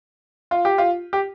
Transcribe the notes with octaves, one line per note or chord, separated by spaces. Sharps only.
F4
G4
F4
G4